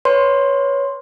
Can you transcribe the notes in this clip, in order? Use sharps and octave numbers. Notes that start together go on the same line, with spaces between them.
B4 C#5 C6